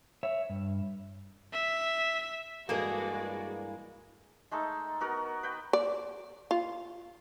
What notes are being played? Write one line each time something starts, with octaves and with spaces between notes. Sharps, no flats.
C#5 E5
G2
E5
G2 E3 G#3 A#3 F#4 G#4 A4 D5
G#3 A3 D#4 A4
B3 F#4 A#4
B4 G5
D5
F4